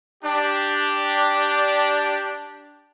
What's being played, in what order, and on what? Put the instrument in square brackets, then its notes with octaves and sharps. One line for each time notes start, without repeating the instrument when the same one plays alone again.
[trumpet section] D4 G4